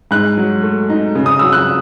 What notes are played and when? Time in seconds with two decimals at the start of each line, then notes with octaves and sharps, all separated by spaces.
0.11 G#2 F#6
0.37 F#3
0.63 A3
0.90 D#4
1.15 C#3
1.26 D#6
1.39 F#3 E6
1.53 F#6